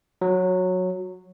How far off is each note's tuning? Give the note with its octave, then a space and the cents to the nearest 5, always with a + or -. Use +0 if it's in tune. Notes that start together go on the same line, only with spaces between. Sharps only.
F#3 -10